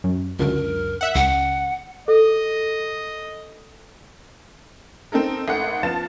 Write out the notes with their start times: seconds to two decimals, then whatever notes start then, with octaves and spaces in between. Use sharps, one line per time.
0.04 F#2
0.39 C#2 F#2 D3 A#4
1.01 E5 F#5
1.15 C#2 F#5
2.08 A4 D#5
5.12 C4 D#4 A4 A#4
5.48 G#1 A3 F#5
5.83 F3 B3 F5 A5 A6 E7